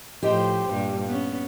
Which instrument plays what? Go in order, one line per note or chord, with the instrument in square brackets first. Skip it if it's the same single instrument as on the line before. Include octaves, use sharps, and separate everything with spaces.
[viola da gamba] A2 F3 C5 [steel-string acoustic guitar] G4 D#5 G5
[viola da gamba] G2 A#2 G3
B3 C#4